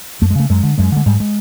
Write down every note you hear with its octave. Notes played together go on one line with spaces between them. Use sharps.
F#2 A3
G#3
C#3 A3
F#2 G#3
D3
F#2 G#3
D3 G#3
G#2 G3
G#3